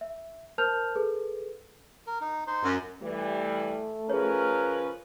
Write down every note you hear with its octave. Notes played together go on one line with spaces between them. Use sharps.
E5
A#4 C5 A5 F6 G6 F7
G#4 A4 B4
A#4
D#4
D#4 C5 C6
F#2
E3 G3 A3
F3 C#4 G#4 A#4 B4 C#5